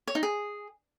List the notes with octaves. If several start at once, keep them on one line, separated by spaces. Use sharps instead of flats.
C#5
D#4
G#4